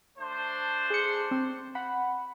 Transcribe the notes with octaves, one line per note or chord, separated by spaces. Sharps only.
A3 D4 C5
G#4 C#7
C4
F#5 B5